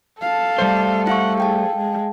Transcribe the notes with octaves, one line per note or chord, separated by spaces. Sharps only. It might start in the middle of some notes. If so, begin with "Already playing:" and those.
A4 F5 A5
G3 A3 C5
E4 F5 F#5 C#6
G#4 F5 G5 A5
G#3